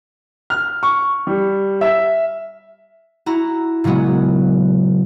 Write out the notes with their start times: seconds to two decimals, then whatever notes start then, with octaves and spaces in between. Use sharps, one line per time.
0.50 F6
0.83 C#6
1.27 G3
1.81 E5
3.26 E4 F#4 A#5
3.84 A#2 C#3 F#3 G#3 B3 F#4